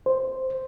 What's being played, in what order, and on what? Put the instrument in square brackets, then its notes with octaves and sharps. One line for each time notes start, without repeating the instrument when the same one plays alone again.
[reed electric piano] C5